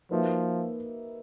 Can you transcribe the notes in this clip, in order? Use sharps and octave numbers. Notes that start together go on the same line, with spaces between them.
F3 A#3 D#4 F#4 B4 E5